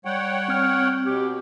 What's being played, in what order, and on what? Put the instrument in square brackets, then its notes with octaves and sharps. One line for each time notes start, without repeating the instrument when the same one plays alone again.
[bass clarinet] G3 [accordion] C#5 F#5 G5
[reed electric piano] C4 F6
[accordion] B2 [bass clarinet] G4